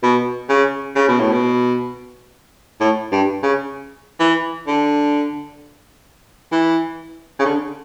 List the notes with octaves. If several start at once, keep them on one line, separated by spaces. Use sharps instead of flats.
B2
C#3
C#3
B2
A2
B2
A2
G2
C#3
E3
D3
E3
C#3
D3